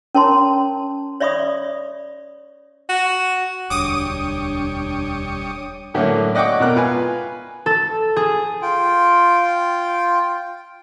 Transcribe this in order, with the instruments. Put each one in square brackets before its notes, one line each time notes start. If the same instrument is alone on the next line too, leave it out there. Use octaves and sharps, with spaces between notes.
[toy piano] C#4 A#4 C#5 A5 A#5 C6
C#5 D5 E5 B5 C#6 D#6
[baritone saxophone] F#4
[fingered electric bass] E1 D2 [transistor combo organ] G3 C#5 [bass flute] D4 [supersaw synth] D6 D#6 D#7
[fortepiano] A2 D3 F#3 A3 A#3 C#4
D5 D#5 F#5 G5 C#6 D6
B2 A#4 F#6
F4 B4 G#5
[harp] A4
G#4
[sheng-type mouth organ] F4 G5